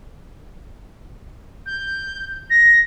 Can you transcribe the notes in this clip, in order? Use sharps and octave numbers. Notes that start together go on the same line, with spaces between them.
G6
A#6